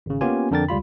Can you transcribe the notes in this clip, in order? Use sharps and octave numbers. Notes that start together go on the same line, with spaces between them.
G#1 C#3
A#3 B3 C#4 F4 G4 G#5
F2 D3 D4 A#4 G5 A6
C#2 G3 F4 B5